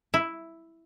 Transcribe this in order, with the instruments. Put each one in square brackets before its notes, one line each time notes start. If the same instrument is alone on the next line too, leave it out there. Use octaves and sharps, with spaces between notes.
[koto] E4